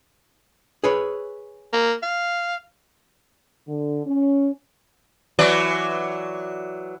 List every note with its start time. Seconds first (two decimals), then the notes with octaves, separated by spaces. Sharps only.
0.84 G#4 B4 C#5
1.73 A#3
2.03 F5
3.67 D3
4.05 C#4
5.39 E3 F#3 D5